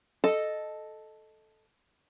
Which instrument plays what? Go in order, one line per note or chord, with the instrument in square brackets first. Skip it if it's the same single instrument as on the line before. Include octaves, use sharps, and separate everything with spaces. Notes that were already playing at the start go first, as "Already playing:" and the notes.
[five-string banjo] A4 D#5